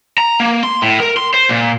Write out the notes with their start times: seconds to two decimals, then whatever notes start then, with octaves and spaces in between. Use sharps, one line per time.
0.18 A#5
0.40 A#3
0.63 C6
0.82 A2
1.00 A#4
1.17 C6
1.34 C5
1.49 A#2